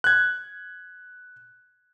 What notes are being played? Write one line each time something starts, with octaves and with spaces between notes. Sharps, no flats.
F#6 G#6